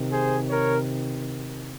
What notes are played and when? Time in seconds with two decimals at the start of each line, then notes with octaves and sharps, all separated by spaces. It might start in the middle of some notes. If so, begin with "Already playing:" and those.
Already playing: C3 D#3
0.10 G#4 C5
0.48 A#4 C#5